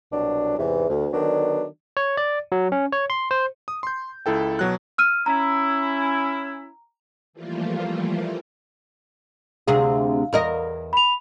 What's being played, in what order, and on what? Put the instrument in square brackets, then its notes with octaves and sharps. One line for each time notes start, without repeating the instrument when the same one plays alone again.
[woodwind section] C2 B2 F#3 D4
E2 G#2 C3 E3
D2
D3 D#3 F#3 B3 D4
[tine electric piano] C#5
D5
F#3
C#4
C#5
C6
C5
[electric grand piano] D#6
C6 G6
C#2 E4 A4 G5
B2 F#3 F#6
[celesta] E6 F6 D#7
[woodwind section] C#4 E4 [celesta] A#5
[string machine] E3 F3 G3 A3 A#3 F4
[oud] D2 C3 G#4 [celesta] F5
[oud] E2 A#4 D#5
[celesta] B5 F7